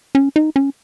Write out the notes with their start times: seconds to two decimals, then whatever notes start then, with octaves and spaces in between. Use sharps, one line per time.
0.15 C#4
0.36 D#4
0.56 C#4